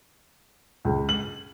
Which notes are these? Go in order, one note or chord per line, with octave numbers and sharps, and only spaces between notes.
C#2
F#7